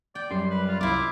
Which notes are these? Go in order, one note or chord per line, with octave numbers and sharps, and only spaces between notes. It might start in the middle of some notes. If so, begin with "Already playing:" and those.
D5 G5
F#2 G3 C6
B4
F4
C2 E4 F4 D6